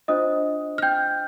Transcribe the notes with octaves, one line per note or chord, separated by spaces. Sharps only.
D4 F4 C5 D#5 D#6
F6
G5 G6